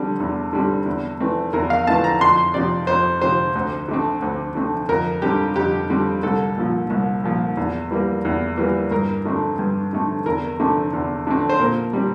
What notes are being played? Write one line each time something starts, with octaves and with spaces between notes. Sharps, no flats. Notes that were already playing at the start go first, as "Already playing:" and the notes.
Already playing: D3 G3 C4
E2
D3 G3 C4
E2
E3 A3 C4
E2 A#4
F5
E3 A3 C4 A5
A#5
F2 C6
C3 F3 C4 D5
F2 C5
C3 F3 C4 C5
D2
D3 A3 C4
D2
D3 A3 C4
F2 A#4
D3 G3 C4 G4
F2 G4
D3 G3 C4
C2 A4
A#2 F3
C2
A#2 F3
E2
E3 G3 A#3
E2
E3 G3 A#3
G2 A#4
D3 A3 C4
G2
D3 A3 C4
E2 A#4
D3 A3 C4
E2
D3 A3 C4
C5
A#2 A#4
G3 C4